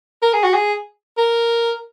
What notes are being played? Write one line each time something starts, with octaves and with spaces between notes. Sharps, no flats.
A#4
G#4
F#4
G#4
A#4